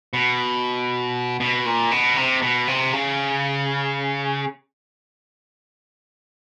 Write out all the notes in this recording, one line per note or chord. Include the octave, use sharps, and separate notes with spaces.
B2
B2
A#2
B2
C3
B2
C3
C#3